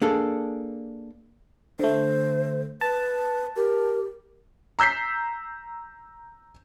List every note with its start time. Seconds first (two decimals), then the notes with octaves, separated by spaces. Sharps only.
0.02 A#3 D4 G#4 A4
1.79 D3 A3 C5
2.81 B4 A5
3.56 G4 A#4
4.79 A#5 E6 G6 B6 C7